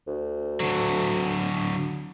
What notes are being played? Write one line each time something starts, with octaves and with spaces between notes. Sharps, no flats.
D2
D3 F#3